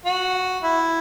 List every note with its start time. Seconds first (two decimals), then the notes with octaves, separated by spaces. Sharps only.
0.05 F#4
0.63 E4